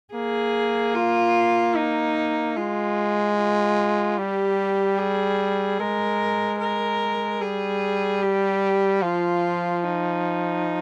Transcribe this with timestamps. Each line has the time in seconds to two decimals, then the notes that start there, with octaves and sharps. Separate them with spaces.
0.14 A#3 G#4
0.95 F4
1.76 D#4
2.56 G#3 F4
3.37 F4
4.18 G3 G4
4.99 G#4
5.80 G#3 A#4
6.60 A#4
7.41 G3 G#4
8.22 G4
9.02 F3 F4
9.83 D#4